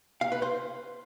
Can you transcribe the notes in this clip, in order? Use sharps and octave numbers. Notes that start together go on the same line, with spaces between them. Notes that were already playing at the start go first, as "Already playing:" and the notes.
F5
B4
C5